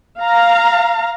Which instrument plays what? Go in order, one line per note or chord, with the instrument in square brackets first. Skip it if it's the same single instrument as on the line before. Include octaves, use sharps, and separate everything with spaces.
[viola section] F5 A#5